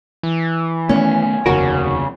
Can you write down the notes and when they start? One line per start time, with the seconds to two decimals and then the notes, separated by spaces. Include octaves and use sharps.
0.23 E3
0.89 D#3 A3 B3 C#4
1.46 F1 D#2 C#3 F#4 A#4